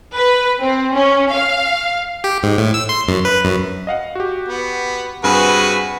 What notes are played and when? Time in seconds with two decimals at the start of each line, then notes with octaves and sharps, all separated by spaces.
0.15 B4
0.61 C4
0.94 C#4
1.33 F5
2.24 G4
2.43 G#2
2.58 A2
2.74 E6
2.89 C6
3.08 F#2
3.25 B4
3.45 F#2
3.87 D#5 F5 F#5
4.15 F#4 G4
4.48 B3
5.24 G2 C4 F#4 G#4 B4